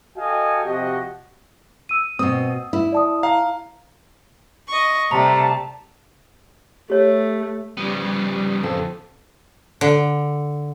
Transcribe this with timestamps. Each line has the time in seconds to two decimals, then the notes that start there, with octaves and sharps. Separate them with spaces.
0.16 F#4 A4 D#5 F5 G5 G#5
0.64 C3 F3 F#4 G4 D#5
1.89 E6 D#7
2.19 B2 C4 D#6
2.73 E4
2.92 D5 A5 D#6
3.23 F5 A#5
4.67 D#5 C#6
5.11 C3 G3 A3 A5 A#5
6.90 A3 G4 C#5
7.77 C#3 F3 G3 B3
8.63 F2 A4
9.81 D3